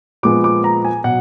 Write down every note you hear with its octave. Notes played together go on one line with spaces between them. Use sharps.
A#2 F3 G#3 B3 D6
D6
A#5
G#5
B2 F#3 F#5